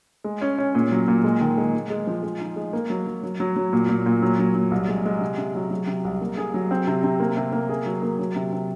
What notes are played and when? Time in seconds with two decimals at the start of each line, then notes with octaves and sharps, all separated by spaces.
0.24 G#3
0.41 C#4
0.58 C#4
0.75 A#2
0.92 F#3
1.08 A#2
1.24 G#3
1.41 D#3
1.58 G#3
1.75 G#3
1.90 G#3
2.07 F3
2.23 G#3
2.40 D#4
2.56 G#3
2.73 A#3
2.90 F#3
3.07 F#3
3.23 F#3
3.40 F#3
3.56 F#3
3.73 A#2
3.89 A#2
4.06 A#2
4.22 F#3
4.39 F#3
4.55 F#3
4.71 C2
4.88 G#3
5.06 G#3
5.21 C3
5.38 C3
5.55 F#3
5.71 F#3
5.87 C3
6.05 C2
6.21 A#3
6.37 G#4
6.54 F#3
6.71 C4
6.88 C3
7.04 C3
7.20 A#3
7.37 C3
7.53 A#3
7.69 G#4
7.86 F#3
8.02 A#3
8.19 F#3
8.36 C3
8.53 C3